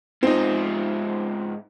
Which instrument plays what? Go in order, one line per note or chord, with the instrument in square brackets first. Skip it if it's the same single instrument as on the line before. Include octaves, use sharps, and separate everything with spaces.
[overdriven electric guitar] G#2 F4 [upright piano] C4 D#4